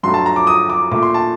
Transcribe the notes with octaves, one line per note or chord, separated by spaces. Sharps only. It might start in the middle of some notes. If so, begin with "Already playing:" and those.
G2 F#3 A3 C6
A5
A#5
D6
D#6
D6
A#2 A3 D6
C6
A5